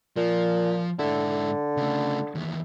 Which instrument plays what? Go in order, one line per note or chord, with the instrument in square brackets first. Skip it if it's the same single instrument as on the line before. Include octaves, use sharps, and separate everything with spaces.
[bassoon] A#2 [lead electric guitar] F3
[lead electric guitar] G#2 E4 [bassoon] D3
[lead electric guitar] C#3 A3
D#2 E3